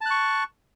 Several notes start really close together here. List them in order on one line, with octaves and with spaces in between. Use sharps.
A5 F#6 C#6